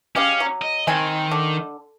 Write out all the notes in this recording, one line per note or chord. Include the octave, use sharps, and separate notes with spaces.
G#3 C#4 G4 F5
F#3
D#5
D#3 C4 G#5
D3